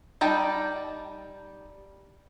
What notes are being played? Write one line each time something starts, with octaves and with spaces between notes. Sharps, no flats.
G3 D#4 G5 A5